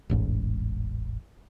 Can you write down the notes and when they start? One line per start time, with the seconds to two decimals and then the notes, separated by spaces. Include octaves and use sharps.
0.10 E1 A1 G#2